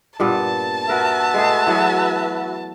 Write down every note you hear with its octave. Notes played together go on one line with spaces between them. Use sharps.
G2 A#2 B3 A5
F#4 A#4 B4 E5
G#3 A3 G#4
E3 F#3 B3